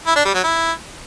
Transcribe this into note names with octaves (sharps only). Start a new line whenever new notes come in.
E4
D4
G3
F#3
E4